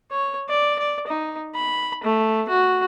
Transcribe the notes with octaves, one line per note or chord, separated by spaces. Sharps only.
C#5
D5
D5
D#4
B5
A3
F#4